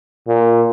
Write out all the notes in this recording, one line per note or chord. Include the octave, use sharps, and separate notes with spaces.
A#2